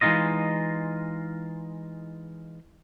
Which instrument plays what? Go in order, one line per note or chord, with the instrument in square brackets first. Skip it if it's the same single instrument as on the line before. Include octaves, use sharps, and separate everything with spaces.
[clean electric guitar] E3 G#3 A3 D#4 F4 D#5